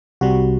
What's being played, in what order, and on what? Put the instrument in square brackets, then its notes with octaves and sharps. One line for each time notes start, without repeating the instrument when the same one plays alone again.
[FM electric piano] C2 C3 G3 F#4